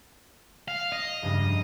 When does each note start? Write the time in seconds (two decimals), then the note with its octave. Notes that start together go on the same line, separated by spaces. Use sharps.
0.68 F5
0.92 D#5
1.22 F1 C#2 G2